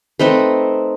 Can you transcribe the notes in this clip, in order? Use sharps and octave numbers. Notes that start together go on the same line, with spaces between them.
A3 C4 D#4 B4